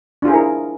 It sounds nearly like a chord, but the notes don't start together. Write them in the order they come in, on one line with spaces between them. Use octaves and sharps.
D4 F4 G#4 E4 A#4